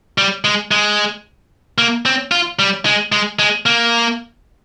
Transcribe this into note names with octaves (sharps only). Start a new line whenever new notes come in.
G3
G#3
G#3
A#3
C4
F4
G3
G#3
G#3
G#3
A#3